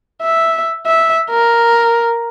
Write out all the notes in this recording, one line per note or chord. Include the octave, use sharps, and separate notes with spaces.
E5
E5
A#4